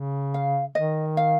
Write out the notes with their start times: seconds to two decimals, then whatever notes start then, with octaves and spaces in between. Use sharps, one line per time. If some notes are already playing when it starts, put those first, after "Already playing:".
Already playing: C#3
0.34 F5
0.75 D#3 D#5
1.17 F5